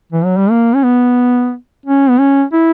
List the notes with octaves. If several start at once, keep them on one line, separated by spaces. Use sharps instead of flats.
E3
F#3
G3
A#3
C#4
B3
C#4
B3
C#4
E4